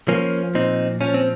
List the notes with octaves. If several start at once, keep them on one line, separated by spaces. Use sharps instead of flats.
F3 A#3 C#4
A#2 C4 D#4
F3 C#4
C4